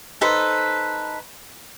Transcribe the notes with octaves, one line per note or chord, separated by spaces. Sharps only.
D#4 A4 B4 C5